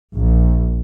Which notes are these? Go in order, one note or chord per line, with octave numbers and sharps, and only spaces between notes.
A#1